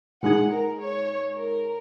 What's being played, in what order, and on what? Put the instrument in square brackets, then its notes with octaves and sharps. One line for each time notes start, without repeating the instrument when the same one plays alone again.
[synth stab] A#2 G#3 D#4 G#4 [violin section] F#5
[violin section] A#4
C#5
A#4